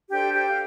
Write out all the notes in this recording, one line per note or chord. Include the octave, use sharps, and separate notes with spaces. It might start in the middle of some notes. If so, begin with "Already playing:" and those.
D4 G4 A4 C5 G5
G4 G5
F5